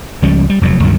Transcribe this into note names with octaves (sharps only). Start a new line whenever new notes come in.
C#2 F3 G3 C#4
G3
F1 E2 C3 F#3
C#2 G2 D#3 F#3